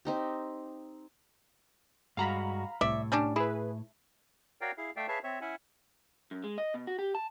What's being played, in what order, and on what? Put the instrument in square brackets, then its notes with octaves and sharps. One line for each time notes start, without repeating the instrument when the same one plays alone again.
[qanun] C4 D#4 G4
[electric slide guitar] G2 G#3 F#4 [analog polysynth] F5 A#5 B5
[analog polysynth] C2 [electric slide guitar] A2 [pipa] D5 E5
[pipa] G3 C#4 D4
[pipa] E4 [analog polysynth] G#4 B4
[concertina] F#4 A#4 C#5 D5 F5 G5
E4 G#4 F5
A3 D5 E5 F5 G5
G#4 B4 C#5 E5 F5 A5
C4 C#5 E5
C#4 E4 E5 F#5 G#5
[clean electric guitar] F#2
G#3
D#5
B2
F#4
G4
A5